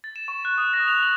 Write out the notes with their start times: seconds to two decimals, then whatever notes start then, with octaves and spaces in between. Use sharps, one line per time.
0.04 A6
0.16 E7
0.28 C#6
0.45 F#6
0.58 D#6
0.73 A#6
0.88 F7
1.03 F#7